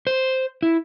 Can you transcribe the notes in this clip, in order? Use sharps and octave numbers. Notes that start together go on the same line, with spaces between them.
C5
E4